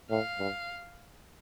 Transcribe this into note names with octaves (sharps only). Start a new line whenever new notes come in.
A2 F5
G2